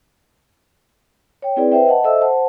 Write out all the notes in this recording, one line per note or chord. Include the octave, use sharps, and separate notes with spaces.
C#5 G5
C4 E4 G#4 B4 D5
B4 C5 E5 G5
D#5 F#5 A5
A4 C5 D#5 E5 E6
C5 F#5 A5